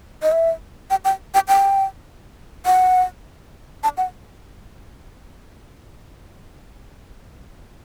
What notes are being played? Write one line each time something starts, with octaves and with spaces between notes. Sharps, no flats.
D#5
E5
G5
G5
G5
G5
F#5
A5
F#5